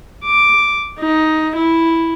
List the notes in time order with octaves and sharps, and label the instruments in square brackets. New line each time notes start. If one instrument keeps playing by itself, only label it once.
[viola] D6
D#4
E4